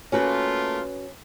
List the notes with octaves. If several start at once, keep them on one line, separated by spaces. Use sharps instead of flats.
A3 A#3 C#4 F4 F#4 B4